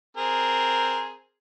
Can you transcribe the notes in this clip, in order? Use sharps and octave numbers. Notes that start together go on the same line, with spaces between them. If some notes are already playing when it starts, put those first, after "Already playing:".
C4 G#4 A#4